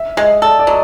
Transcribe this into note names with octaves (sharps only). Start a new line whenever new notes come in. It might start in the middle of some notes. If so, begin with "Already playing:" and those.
Already playing: E5
G#3 D#5
A4 D5
D5
F#3 D#5